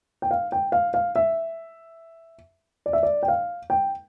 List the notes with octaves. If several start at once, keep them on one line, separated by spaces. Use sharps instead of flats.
G5
F5
G5
F5
F5
E5
D5
E5
D5
G5
F5
G5